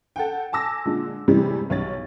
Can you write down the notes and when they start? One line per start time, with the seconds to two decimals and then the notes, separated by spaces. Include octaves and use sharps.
0.16 A4 F#5 G5
0.52 G#5 A5 D6 E6 A#6
0.85 A#2 D3 G#3
1.28 A2 C3 E3 G3 G#3
1.70 B1 C#5 A6